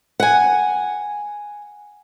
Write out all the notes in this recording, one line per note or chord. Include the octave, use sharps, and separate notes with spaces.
F#5 G#5